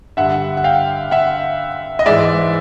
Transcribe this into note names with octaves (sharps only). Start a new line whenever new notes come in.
G2 D3 G3 E5 F#5
F#5
F5 G5
E5 F#5
D#5
G#2 E3 G#3 D5 E5